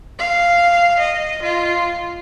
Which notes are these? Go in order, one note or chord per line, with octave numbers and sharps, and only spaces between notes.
F5
D#5
F4